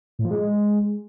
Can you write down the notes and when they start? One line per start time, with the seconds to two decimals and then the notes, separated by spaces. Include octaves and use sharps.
0.19 A2
0.25 F3
0.31 G#3